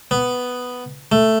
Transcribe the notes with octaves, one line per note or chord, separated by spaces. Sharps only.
B3
A3